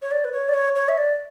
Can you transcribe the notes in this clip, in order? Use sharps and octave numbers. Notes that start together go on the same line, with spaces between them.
C#5
D5
B4
C#5
D5
C#5
C#5
E5
D5